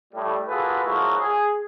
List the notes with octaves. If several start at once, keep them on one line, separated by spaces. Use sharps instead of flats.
A2 G3
A#3 F4 F#4 G#4 A4 B4
F3 F#3 G#3 A#3 E4 F#4
G#4